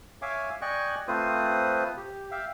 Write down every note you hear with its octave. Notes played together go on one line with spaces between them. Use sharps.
C#5 E5 F5 G#5 D6
D5 D#5 G5 G#5 C#6 F#6
A3 C4 F4 B4 C5 D#6
G4
E5 F5 G5